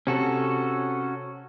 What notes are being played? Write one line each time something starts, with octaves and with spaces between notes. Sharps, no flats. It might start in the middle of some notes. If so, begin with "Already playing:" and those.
C3 C#4 F#4 A4